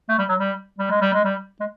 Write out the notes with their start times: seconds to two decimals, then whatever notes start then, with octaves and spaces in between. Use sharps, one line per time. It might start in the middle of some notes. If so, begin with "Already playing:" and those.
0.09 A3
0.19 G3
0.29 F#3
0.39 G3
0.79 G3
0.91 G#3
1.01 G3
1.14 G#3
1.24 G3
1.60 G#3